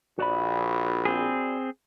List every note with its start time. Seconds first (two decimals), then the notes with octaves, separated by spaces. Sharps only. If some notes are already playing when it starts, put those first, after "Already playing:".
0.19 A#1 F#4 D5 B5
1.05 C4 G#4